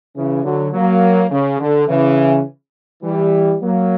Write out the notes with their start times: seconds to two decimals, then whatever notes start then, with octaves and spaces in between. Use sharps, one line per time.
0.15 C#3 E3
0.44 D3 F#3
0.72 F#3 A#3
1.31 C#3
1.59 D3
1.88 C#3 E3
3.03 E3 G3
3.61 F#3 A#3